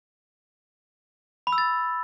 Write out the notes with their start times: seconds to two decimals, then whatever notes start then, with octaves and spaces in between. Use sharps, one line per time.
1.47 B5
1.52 E6
1.58 A6